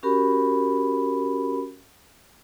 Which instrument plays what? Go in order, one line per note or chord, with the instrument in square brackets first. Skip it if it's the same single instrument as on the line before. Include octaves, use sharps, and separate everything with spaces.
[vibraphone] C#4 F#4 G4 A#4 B5